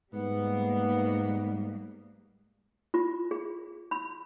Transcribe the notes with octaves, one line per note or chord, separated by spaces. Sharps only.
G#2 G3 A#3 B3
F4
G#4
B5